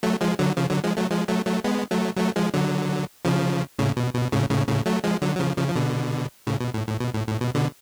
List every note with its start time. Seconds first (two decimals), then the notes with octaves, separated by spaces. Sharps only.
0.03 F#3 A3
0.21 F3 G#3
0.39 D3 F#3
0.57 C#3 F3
0.70 D3 F#3
0.84 F3 G#3
0.97 F#3 A3
1.11 F3 G#3
1.28 F#3 A3
1.46 F#3 A3
1.64 G#3 B3
1.91 F#3 A3
2.17 F#3 A3
2.36 F3 G#3
2.54 D3 F#3
3.25 C#3 F3
3.79 A2 C#3
3.97 B2
4.15 B2
4.32 A2 C#3
4.50 A2 C#3
4.68 A2 C#3
4.86 F#3 A3
5.04 F3 G#3
5.22 D3 F#3
5.36 F#3
5.40 C#3 F3
5.58 C#3 F3
5.68 F3
5.76 B2 D3
6.47 A2 C#3
6.61 B2
6.74 A2
6.87 A2
7.00 B2
7.14 A2
7.28 A2
7.41 B2
7.54 B2 D3